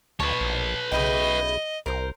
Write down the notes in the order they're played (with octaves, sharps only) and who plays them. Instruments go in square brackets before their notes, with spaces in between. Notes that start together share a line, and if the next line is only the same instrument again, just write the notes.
[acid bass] D2 [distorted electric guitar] B4 C#5 [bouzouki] A5
[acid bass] A#1
[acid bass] B1 [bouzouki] C#3 E4 G5 [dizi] D#5
[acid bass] C2 [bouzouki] A#4 C5